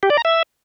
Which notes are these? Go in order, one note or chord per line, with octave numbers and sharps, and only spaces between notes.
G4
D5
A#5
E5